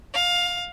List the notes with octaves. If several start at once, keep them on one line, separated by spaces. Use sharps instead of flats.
F5